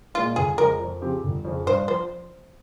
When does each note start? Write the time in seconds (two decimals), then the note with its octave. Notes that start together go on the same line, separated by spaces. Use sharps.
0.14 A#2 G#3 F4
0.36 G1 G#4
0.58 F2 C#3 G#3 A#4
0.80 F2
1.01 C#3 F3 C4 G4
1.23 G1
1.45 F2 C#3
1.66 G2 C5
1.88 F3 C5